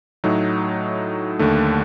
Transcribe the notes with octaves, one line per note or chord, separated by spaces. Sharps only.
A2 F#3 A3 D#4
D#2 D3 A3